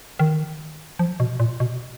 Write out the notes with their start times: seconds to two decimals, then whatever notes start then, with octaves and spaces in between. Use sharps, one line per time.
0.19 D#3
0.99 F3
1.20 B2
1.40 A#2
1.60 B2